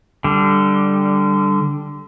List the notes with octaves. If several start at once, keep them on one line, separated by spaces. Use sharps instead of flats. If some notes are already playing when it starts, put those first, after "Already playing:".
D3 G3